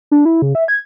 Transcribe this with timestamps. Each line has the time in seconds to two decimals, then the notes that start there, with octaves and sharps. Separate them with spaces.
0.11 D4
0.25 E4
0.42 C#3
0.55 E5
0.68 G#6